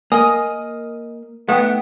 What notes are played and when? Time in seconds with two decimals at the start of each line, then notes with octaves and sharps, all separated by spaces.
0.12 A#3 A#4 D#5 G#5 D#6
1.49 A3 B3 D#4 G5